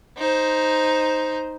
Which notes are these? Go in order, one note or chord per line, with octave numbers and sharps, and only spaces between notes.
D#4 C5